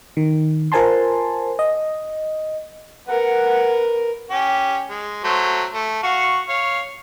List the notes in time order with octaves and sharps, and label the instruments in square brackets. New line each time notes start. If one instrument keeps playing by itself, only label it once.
[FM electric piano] D#3
F4 A#4 C5 G#5 A5 C6
D#5
[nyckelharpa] A#4 B4 [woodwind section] F#5
[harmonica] C#4 G4
G#3
F#3 A3 C5
A3
F#4 F5 C#6
C#5 F5